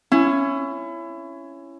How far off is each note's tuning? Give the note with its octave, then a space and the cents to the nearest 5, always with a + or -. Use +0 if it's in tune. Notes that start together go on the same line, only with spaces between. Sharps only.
C#4 +0 E4 +25